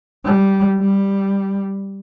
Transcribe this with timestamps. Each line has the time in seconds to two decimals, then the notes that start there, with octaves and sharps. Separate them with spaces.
0.25 G3
0.80 G3